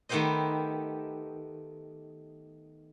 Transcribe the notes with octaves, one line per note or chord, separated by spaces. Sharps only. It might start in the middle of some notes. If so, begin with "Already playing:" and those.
D#3 A3 B3 G4 C5 D#5